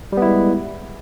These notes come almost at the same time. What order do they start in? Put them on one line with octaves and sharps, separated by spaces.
G3 B3 E4 G#3